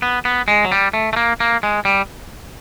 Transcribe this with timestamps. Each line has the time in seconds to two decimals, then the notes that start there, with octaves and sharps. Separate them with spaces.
0.02 B3
0.25 B3
0.48 G#3
0.65 F#3
0.72 G3
0.93 A3
1.13 A3
1.16 A#3
1.40 A#3
1.63 G#3
1.85 G3